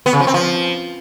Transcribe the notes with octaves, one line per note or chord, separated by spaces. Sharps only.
B3
C#3
F3
C4
F3